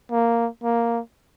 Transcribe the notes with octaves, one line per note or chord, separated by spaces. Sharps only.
A#3
A#3